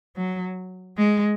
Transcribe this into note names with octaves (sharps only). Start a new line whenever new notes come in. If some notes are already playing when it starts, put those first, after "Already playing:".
F#3
G#3